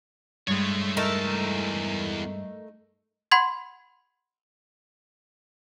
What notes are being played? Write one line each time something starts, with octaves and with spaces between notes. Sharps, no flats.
G2 G#3 A3 C#5
E2 A3 D#4 A#4 A5
F#5 B5 C6 G#6